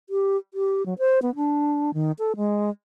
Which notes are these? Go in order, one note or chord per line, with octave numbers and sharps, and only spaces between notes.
G4
G4
F#3
C5
B3
D4
D#3
A4
G#3